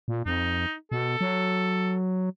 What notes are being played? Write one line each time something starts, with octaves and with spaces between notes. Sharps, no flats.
A#2
F2 D#4
B2 A4
F#3